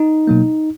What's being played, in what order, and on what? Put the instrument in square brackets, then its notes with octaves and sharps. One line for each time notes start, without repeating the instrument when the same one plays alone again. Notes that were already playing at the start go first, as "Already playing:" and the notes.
Already playing: [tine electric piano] D#4
B2 F#3 A#3